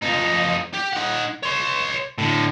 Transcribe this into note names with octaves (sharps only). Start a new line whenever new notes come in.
F2 D#4
G4
D#4 F#5
C#5 C6
A2 D3